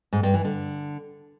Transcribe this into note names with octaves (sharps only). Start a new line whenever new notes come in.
G#2
G2
E3
D3